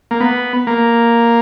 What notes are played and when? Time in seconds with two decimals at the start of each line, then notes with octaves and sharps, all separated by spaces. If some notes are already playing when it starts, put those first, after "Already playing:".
0.11 A#3
0.21 B3
0.67 A#3